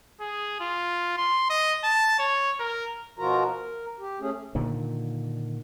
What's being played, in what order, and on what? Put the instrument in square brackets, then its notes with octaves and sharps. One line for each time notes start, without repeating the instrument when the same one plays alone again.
[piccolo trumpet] G#4
F4
C6
D#5
A5
C#5
A#4
[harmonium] B2 F3 F4 F#4 A#4 A#5
A#4
G4
A3 C#4 G#4
[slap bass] A#2 D3 D#3